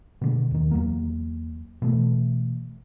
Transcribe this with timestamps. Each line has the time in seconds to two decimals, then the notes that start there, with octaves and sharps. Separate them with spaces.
0.21 B2 D3 G#3
0.51 D#2 D#3
0.71 E2 F#3 A#3
1.82 B2 E3 A3